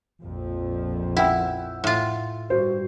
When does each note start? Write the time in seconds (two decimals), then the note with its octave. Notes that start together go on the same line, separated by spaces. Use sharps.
0.22 A#1 F2 F3
1.17 E4 F#5 G5 E6
1.84 A2 F4
2.50 G2 F#4 C5